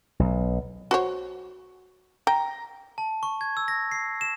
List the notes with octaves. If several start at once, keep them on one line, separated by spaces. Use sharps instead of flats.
B1
F#4 C5 C#5
G5 A#5
A5
C#6
G#6
E6
A#6
C7
E7